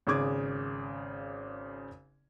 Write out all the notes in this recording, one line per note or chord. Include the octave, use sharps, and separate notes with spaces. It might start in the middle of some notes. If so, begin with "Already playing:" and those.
G#1 C#3 G#4 D6 G#6